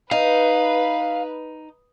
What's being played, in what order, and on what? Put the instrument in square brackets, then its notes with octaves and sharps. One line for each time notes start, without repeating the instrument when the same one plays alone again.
[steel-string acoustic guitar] D#4 [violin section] B4 [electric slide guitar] F5